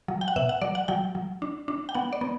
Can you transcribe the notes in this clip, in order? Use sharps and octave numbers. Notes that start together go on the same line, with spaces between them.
F#3
G5
F#5
B2 E5
F#5
F#3 D5
F#5
F#3 G5
F#3
D4
D4
G5
B3 F#5
D5
B3